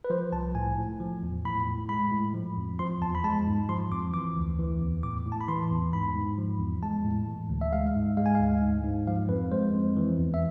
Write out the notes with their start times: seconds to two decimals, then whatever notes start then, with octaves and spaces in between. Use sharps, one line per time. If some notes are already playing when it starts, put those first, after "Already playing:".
0.04 B4
0.10 F3 C5
0.32 C2 A5
0.55 A2 G#5
0.77 A2
1.00 F3
1.23 E2
1.45 A2 B5
1.67 A2
1.89 G#3 B5
2.12 A2
2.34 F3
2.57 F2
2.79 F3 C6
3.02 E2 A5
3.15 B5
3.24 G#3 A5
3.47 G#2
3.69 F3 C6
3.91 F2 D6
4.13 E3 D6
4.37 D2
4.59 E3
4.82 E2
5.03 A2 D6
5.26 A2
5.32 A5
5.41 B5
5.48 E3 C6
5.71 E2
5.93 G#2 B5
6.16 G#2
6.38 F3
6.60 E2
6.83 G#3 A5
7.05 A2
7.27 E3
7.49 D2
7.61 E5
7.72 G#3 F5
7.95 G#2
8.17 G#3 F5
8.26 G#5
8.35 D2 F5
8.62 G#2
8.84 G#2
9.07 F3 F5
9.29 F2 B4
9.52 G#3 C5
9.74 F2
9.97 E3
10.19 E2
10.34 E5